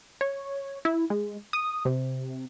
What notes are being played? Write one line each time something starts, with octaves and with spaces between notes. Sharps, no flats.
C#5
E4
G#3
D#6
C3